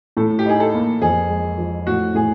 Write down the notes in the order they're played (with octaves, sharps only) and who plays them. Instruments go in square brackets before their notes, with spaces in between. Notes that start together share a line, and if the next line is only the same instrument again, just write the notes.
[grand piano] A2 [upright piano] A4
[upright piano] G4
[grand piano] D#4 [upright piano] G#4
[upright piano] A4
[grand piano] A#3
[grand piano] F2 [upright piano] G#4
[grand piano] G#3
F3
[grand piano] A2 [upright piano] F#4
[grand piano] A2 [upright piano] G#4